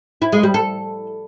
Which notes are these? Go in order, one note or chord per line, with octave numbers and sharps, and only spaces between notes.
E4
G#3
G3
A4